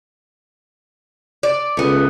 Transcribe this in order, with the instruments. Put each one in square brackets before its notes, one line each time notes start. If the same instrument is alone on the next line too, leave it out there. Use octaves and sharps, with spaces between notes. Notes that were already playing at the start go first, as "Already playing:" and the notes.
[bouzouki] D5
[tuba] C#2 [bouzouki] A3 B3